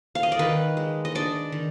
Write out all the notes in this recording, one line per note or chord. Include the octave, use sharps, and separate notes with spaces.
F5
D#5
D5
D#3 B4
G#3
D#5
D4 D5
D#3